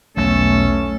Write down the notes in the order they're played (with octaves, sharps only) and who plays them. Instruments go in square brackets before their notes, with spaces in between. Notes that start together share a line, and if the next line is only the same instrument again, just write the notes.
[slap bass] B1 E2 [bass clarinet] A3 [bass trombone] C#4 [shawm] A4